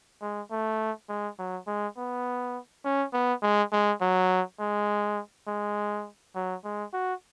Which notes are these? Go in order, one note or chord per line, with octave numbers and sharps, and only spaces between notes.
G#3
A3
G#3
F#3
G#3
B3
C#4
B3
G#3
G#3
F#3
G#3
G#3
F#3
G#3
F#4